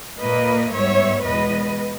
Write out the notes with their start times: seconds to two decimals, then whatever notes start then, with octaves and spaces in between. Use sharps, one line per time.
0.21 A#2 A#3 B4 D#5
0.73 G#2 G3 B3 C#5 E5
1.25 E2 B2 G#3 B3 B4 D#5